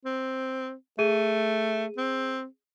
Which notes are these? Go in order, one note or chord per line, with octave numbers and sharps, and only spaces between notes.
C4
A3 G#4 D#7
C4